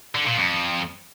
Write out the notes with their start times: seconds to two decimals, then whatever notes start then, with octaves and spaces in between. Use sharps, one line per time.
0.15 D3
0.26 A#2
0.38 F2